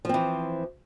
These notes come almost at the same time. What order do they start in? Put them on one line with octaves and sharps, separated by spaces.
F3 C4 E3